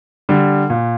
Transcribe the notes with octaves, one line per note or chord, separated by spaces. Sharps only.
D3 G3
A#2